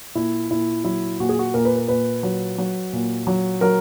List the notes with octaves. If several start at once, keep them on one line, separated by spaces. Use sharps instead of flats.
A#2 E4
A#2 E4
F#3 E4
A#2 F#4
G#4
F#4
A#2 A#4
B4
A#4
A#2 B4
F#3
F#3
A#2
F#3
F#3 A#4